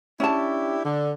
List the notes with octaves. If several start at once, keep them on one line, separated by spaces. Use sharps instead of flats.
C#4 D4 E4 G4 A5
D3